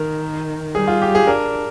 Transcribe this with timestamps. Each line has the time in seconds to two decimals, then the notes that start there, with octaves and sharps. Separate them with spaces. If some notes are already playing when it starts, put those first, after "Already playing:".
Already playing: D#3 A#4
0.75 G3 G#4
0.88 F4
1.02 G4
1.15 G#4
1.27 D4 A#4